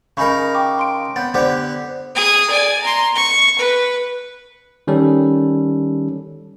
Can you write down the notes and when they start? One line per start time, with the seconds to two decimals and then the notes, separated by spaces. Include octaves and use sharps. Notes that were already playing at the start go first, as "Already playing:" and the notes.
0.17 C#3 D#4 A#4 G#5 B5 C#6
0.55 G5 C#6 D6
0.77 F5 C6 D7
1.16 B3 C#5 G6 A6
1.34 D3 B3 G4 C5 D5 D6
2.15 G#4 D#6
2.50 D5 G#5
2.82 A#5 C6
3.15 C#6
3.59 B4
4.87 D#3 G3 C#4 A4